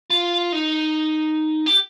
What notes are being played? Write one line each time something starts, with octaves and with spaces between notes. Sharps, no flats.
F4
D#4
G4